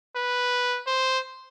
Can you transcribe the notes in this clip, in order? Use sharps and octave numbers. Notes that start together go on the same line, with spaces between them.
B4
C5